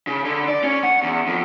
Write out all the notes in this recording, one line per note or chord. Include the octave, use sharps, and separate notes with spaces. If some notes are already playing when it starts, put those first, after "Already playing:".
C#3
D3
D5
C#4
F#5
E2
F2